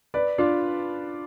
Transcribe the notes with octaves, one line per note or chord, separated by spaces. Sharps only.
B4 D5
D4 F4